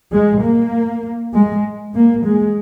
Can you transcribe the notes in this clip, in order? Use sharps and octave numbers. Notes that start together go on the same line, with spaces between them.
G#3
A#3
G#3
A#3
G#3